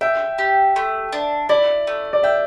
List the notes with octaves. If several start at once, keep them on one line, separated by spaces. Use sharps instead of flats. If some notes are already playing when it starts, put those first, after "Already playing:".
E5 G5
G4
A3
D4
E4 D5
A3
D5
E5 G5